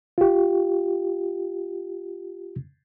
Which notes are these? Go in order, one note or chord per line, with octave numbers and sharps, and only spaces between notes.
F4 G4